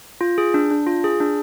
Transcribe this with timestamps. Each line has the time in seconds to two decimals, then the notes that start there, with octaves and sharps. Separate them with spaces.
0.21 F4
0.38 G#4
0.54 D4
0.71 D4
0.87 F4
1.04 G#4
1.20 D4